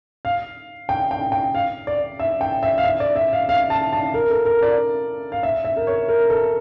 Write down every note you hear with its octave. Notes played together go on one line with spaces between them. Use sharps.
F5
G5
G5
G5
F5
D5
E5
G5
E5
F5
E5
D5
E5
F5
F5
A5
A5
A#4
A4
A#4
D5
F5
E5
E5
A#4
C#5
A#4
A4